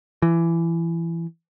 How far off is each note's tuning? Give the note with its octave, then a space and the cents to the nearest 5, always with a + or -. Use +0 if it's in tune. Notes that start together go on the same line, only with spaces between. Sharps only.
E3 +20